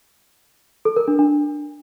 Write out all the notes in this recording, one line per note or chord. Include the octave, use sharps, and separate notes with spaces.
A4
A#4
D4
D4